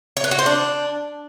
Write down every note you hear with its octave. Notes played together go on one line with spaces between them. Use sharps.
C#5
B4
F#4
C5
D4